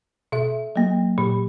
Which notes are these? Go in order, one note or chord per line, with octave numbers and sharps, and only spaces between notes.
B2 E5
F#3 A#3
A#2